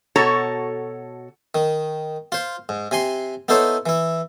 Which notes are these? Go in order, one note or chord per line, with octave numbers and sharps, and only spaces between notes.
B2 F#4 A4 C#5 A#5
D#3
F4 C5
G#2
C3 G#5 C6
B3 D#4 E4 A4 C5 C#5
E3 E4